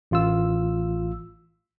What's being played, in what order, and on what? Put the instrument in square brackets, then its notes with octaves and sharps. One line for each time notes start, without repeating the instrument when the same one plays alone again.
[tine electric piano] A1 F4 E6